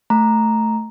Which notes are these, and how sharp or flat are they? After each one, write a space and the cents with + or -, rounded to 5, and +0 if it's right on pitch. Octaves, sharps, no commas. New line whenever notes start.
A3 +0 A#5 +0